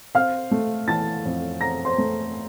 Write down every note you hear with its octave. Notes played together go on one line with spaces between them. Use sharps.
C4 F5 F6
A3
E3 A5 A6
F2
C4 A#5 A#6
C5 C6
A3